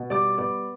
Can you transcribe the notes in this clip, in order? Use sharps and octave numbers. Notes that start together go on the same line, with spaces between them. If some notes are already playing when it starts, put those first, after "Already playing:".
Already playing: B2
G3 D5 D6
B3 D5 D6